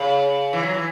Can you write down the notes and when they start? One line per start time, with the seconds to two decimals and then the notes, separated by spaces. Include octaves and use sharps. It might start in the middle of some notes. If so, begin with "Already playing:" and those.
Already playing: C#3
0.53 E3
0.63 F#3
0.74 E3